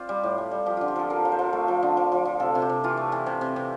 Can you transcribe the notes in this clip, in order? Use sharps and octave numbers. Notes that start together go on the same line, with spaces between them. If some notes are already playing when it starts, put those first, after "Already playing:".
Already playing: C4 F4 C5 D5
G3
A2
G3
G3
F3 G4
D3 F4
G4
F3 A4
F3 A#4
F3
C5
F3
A3
F3
D3
F3
F3
F3
C3 A4
C3
G4
C3
E3 F4
A3
E3
C3
C3
C3